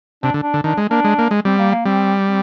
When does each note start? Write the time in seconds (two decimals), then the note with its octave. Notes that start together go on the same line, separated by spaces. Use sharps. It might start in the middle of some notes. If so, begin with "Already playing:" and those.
0.23 C3 D4
0.34 D3
0.42 D4
0.54 D3
0.64 D#3 D4
0.78 G#3
0.91 A#3 D4
1.04 G#3
1.19 A#3
1.31 G#3
1.45 G3 C4
1.59 A#3
1.71 A#3
1.85 G3 C4
2.26 C4